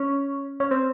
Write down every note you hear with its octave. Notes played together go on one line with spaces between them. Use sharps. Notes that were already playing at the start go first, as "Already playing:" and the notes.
Already playing: C#4
C#4
C4